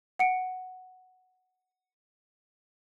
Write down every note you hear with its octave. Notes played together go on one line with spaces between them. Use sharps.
F#5 C#7 D7